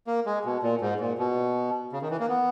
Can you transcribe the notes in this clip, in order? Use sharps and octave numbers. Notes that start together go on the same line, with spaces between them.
A#3
G#3
B2
A#2
G#2
A#2
B2
C#3
D#3
E3
A#3
B3